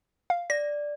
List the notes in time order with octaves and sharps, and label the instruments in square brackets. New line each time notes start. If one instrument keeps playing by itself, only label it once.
[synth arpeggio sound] F5
[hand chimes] D5 [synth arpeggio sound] A#6